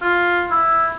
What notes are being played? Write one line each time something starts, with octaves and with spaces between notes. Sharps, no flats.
F4
E4